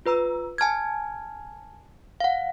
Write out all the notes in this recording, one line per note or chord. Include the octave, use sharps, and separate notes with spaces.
F4 B4 A#5 E6
G#5 A5 F6 G#6
F5 F#5